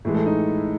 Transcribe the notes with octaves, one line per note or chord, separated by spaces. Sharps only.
A2 E3 G#3
A4
D#4